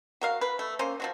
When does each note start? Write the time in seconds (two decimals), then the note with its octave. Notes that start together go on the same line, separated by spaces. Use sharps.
0.21 F#4 A#4 F5
0.41 B4
0.59 A3
0.79 A#3 C#4 C5
1.00 F3 F#3 F#4